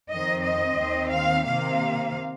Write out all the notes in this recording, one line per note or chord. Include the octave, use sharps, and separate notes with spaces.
F2 D#3 C4 D#5
D#5
D#2 D#3 C4
F5
C3 D#3 A#3 F5